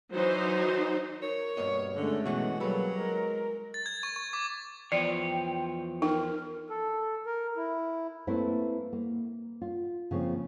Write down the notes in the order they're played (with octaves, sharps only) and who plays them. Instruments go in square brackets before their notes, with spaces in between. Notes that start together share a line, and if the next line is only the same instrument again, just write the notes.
[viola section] E3 F#3 D#4 C5
[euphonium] A#4 [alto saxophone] C#5
[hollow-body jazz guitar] G2 A#3 D#5 [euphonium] B2
[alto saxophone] D3 [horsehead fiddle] G#3 A3 [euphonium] C#4
[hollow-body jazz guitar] B2 E3 B3 [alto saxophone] F#4
[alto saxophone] F#3 [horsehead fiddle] G3 G#4 [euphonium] A#3 [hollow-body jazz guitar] A4 B4
[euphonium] G#3 [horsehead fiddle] A#4
[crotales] A6
G#6
C#6
C#6
D6
[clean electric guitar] E2 F3 C#5 [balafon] D5 [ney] G5
[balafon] D#4 G5 [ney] A#4
[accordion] A4
A#4
E4
[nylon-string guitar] A3 A#3 C4 E4 B4 C5
A#3
F4
C#3 F3 A#3 C4